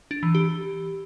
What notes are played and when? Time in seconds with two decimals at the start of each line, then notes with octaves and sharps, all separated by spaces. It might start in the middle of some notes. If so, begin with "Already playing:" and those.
0.11 D4
0.23 E3
0.35 G4